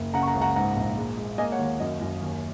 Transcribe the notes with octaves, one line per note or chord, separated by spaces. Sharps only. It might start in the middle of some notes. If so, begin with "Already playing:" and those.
Already playing: F#1
C#3 F#5 A#5
C#6
F#5 A#5
C#2
F#5 A#5
G#2 F#5 A#5
A#1
G#3
G#3
A#3 D#5 G#5
C#5 F#5
D#2
F#2 D#5
F#2
D#2